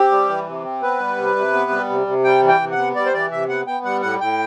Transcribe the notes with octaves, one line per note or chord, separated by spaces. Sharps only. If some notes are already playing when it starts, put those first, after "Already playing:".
Already playing: C4 G4
G3
E3
C3
C4
B3 B4
G3
C3
C3
B3
G3
C3
C3
G3 G5
E3
G5
C3
F#5
B3
G3 D5
C5
E3 D5
C3 E5
B3 F#5
B3 G5
G3 F#5
A2 F#5
A2 G5